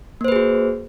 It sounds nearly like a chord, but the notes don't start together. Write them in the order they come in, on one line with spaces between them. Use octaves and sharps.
A#3 C5 B4 G#4 F#4